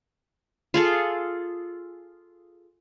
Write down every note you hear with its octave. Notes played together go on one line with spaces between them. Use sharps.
F4 G#4 A4